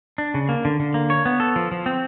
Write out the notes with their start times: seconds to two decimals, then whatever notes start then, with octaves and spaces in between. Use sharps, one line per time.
0.18 D4
0.34 C#3
0.49 A#3
0.65 D3
0.80 D3
0.94 A#3
1.10 C#5
1.26 B3
1.40 A4
1.56 F3
1.72 F3
1.86 C4